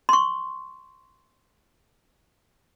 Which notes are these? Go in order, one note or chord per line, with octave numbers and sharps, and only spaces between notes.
C6 C#6